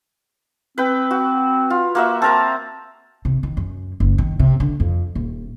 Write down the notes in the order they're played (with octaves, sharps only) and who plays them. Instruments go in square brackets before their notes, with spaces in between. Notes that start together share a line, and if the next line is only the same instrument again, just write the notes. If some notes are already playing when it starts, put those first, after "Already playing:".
[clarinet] C4 [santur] B4 G5
[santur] F#4
F4
A#3 F#4 E5
[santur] C4 A#4 A#5 [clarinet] A5
[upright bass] C3
D#3
F#2
F#1
D#3
C3
D3
F2
D#1